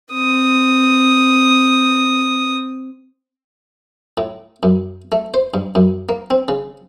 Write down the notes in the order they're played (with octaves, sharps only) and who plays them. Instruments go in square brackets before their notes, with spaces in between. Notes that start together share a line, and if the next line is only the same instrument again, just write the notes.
[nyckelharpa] C4 D#6
[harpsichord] A2
F#2
A3
C5
G2
F#2
A#3
C4
C#3